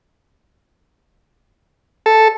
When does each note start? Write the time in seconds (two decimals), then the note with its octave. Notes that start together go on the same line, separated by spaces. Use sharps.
2.06 A4